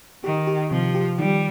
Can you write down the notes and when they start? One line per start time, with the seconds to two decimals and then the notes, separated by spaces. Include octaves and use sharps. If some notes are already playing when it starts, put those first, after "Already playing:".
0.24 D#3 G4
0.47 G4
0.70 C3 F3
0.95 G4
1.18 D#3 G3